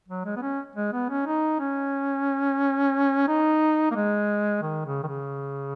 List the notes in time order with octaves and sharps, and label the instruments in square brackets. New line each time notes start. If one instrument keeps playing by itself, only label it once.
[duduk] F#3
G#3
B3
C#4
G#3
B3
C#4
D#4
C#4
D#4
A#3
G#3
D#3
C#3
D#3
C#3